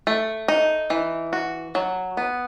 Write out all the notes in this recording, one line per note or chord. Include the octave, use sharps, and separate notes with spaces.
A3
D#4
E3
F#4
F#3
B3